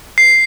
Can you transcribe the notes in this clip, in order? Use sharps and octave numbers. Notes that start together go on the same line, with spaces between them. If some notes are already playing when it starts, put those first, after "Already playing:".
C7